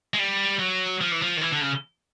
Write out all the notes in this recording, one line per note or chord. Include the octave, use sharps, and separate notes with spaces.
G#3
G3
F#3
F3
E3
F3
D#3
E3
D3
C#3